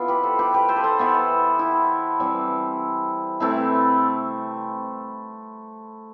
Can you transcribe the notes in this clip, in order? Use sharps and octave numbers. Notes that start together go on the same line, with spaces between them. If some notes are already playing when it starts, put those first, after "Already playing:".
Already playing: E3 B3 F4
G4 B4
A4 C5
G4 B4
G4 B4
A4 C5
B4
A4 C5
E3 B3
E4
E3 G3 C4
C3 E3 A3 C4 E4